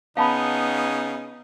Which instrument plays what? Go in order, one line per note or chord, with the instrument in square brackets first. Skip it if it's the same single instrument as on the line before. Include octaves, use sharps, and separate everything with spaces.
[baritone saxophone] C#3 [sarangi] B3 [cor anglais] D#4 [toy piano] F5 A5 B5